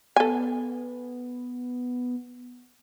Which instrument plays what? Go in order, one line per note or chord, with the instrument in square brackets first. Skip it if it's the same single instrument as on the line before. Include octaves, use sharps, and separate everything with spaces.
[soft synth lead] B3 [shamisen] A4 G#5